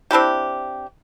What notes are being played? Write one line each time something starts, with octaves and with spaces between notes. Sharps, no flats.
C4 D4 E4 G4